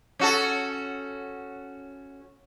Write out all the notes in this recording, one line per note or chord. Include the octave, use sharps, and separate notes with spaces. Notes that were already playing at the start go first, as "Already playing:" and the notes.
C#4 F#4 A4